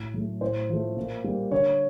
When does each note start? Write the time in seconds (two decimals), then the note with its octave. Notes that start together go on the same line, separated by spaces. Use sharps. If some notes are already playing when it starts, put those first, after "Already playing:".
Already playing: A2
0.14 F#3 A3
0.41 A2 C5
0.70 F3 A3
0.97 A#2
1.24 G3 A#3
1.51 D3 C#5